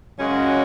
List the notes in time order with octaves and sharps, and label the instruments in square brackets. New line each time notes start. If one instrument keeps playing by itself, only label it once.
[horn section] F#2 C#3 G#3 C#4 F#4